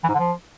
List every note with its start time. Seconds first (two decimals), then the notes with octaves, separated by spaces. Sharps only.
0.04 E3
0.09 G#2
0.14 D3
0.19 F3